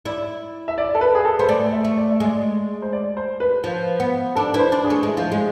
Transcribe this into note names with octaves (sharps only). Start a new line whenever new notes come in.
E4 D5
E5
D5
A4
B4
G#4
A4
B3 C5
A3 D5
E5
A3
D5
E5
G#3
D5
C5
D5
C5
B4
F3
B3
D4 A4
E4 B4
C5
D4
G#4
A3
G#3 E4
F3
G#3